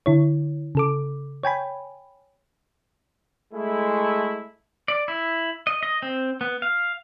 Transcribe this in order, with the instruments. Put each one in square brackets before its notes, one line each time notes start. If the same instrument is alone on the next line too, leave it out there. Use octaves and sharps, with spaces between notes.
[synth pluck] D3 E4 C#5
C#3 A4 D6
C#5 G5 G#5 B5
[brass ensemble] G#3 A3 E4
[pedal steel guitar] D5
E4
D#5
D#5
C4
B3
F5